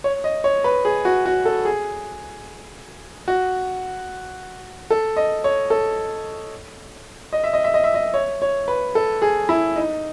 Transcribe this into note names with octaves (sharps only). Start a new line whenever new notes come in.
C#5
D#5
C#5
B4
G#4
F#4
F#4
A4
G#4
F#4
A4
D#5
C#5
A4
D#5
E5
D#5
E5
D#5
E5
D#5
C#5
C#5
B4
A4
G#4
E4
D#4